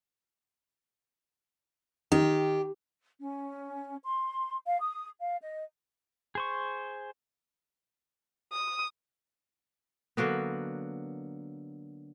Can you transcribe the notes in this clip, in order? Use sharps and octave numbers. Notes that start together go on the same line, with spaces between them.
D#3 G4
C#4
C6
F5
D#6
F5
D#5
G#4 C5 C#6
D#6
D3 F#3 A#3 B3